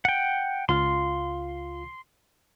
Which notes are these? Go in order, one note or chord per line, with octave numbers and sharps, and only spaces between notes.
F#5 G5
C#2 F4 F5 C6